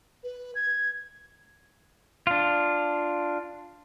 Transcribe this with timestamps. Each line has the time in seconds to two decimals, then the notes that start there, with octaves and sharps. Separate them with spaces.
0.23 B4
0.55 G#6
2.27 D4 F4